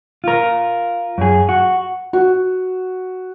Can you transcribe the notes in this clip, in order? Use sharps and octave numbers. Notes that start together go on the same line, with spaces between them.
F4 A#4
F#2 G#4
F#4
F#4